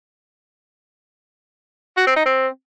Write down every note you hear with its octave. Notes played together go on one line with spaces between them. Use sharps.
F#4
C4
D#4
C4